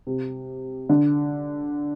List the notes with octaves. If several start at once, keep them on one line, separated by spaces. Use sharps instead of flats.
C3
D3